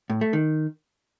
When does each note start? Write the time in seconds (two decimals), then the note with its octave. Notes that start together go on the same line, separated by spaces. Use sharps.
0.10 A2
0.21 A3
0.33 D#3